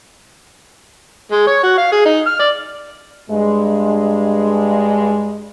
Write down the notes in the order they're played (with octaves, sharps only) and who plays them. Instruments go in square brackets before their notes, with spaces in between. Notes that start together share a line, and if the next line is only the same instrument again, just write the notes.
[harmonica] G#3
C#5
F#4
F5
G#4
D#4
F6
D5
[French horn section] G2 G#3